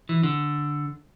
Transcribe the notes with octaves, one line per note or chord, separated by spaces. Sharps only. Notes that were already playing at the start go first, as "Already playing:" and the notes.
E3
D3